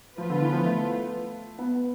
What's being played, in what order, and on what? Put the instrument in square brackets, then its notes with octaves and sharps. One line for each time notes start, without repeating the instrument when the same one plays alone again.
[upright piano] F3 [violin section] B3 F4 B4
[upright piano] D3
E3
F3
A3
B3